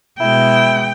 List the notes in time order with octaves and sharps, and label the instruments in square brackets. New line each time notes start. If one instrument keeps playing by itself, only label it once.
[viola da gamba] B2 G#3 [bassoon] E4 [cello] G5